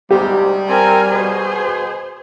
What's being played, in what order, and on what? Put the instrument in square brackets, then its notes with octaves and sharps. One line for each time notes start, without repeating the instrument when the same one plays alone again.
[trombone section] D2 G#2 C3 [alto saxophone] G3 [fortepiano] G4
[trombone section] C4 [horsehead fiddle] A#4 G#5
[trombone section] B2 [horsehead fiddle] G#4 C5